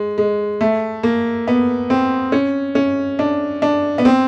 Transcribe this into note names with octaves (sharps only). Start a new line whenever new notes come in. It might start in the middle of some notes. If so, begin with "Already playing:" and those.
Already playing: G#3
G#3
A3
A#3
B3
C4
C#4
C#4
D4
D4
B3
C4